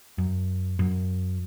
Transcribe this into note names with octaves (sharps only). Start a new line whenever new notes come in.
F#2
F#2